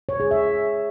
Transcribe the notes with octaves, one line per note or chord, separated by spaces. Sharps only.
C#5
G#4
E5